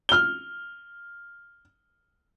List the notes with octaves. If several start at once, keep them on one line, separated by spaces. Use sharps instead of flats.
F6 G7